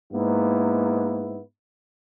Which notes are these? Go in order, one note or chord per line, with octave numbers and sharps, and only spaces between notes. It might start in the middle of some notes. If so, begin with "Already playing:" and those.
G#2 A#3 B3 E4